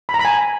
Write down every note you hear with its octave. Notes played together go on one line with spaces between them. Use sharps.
B5
A#5
B5
G#5